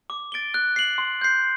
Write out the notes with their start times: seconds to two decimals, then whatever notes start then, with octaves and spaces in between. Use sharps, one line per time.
0.10 D6
0.32 A6 D7 G7
0.54 F#6
0.76 C7 F#7
0.98 C6
1.21 G6 C7